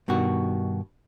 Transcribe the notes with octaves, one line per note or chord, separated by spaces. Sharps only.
G2 B2 D#3 F#4